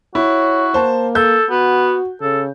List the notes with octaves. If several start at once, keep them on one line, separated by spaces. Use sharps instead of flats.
E4 F#4 C#5
A#3 C5 A5
A4 G6
B3 F#4
C#3 A4